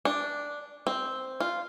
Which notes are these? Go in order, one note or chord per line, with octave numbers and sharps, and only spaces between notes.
D4
C4
F4